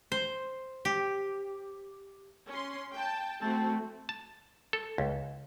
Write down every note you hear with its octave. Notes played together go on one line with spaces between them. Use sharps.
C5
G4
C#4 C6
G5 A5
A3 C4 F#4 A5
A5
A4
C#2